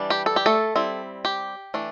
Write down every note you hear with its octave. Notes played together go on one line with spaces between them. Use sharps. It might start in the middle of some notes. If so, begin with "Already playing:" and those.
Already playing: E3 G3 D4
G4
A4
G4
A3 A4
G3 C4 E4
G4
E3 A3 D4